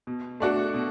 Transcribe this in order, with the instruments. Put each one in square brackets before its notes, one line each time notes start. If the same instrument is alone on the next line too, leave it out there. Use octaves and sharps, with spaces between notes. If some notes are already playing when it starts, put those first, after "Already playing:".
[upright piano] B2
A3 D4 F#4 A4
B2